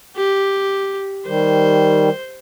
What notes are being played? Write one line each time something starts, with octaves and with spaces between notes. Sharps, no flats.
G4
D#3 G3 C5